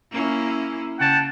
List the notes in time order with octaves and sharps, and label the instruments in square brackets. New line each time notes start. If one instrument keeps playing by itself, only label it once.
[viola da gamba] A#3 C#4 E4
[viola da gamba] C#3 [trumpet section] F#5 G5 A5